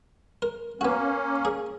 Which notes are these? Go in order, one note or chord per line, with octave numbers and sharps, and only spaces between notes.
A#4
A#3 B3 C#4 F#4
G#4